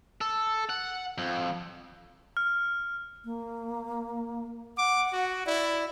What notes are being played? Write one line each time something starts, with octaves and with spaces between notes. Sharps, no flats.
A4
F#5
F2
F6
A#3
F#5 D6
F#4
E4 D5